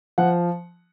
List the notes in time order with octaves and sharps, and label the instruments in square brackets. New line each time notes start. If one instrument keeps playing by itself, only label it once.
[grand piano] F3 F#5